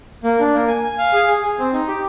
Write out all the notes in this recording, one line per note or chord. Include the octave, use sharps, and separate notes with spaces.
A#3
D4
A#3
G#5
G#5
F5
G#4
G#4
G#4
C4
D#4
G4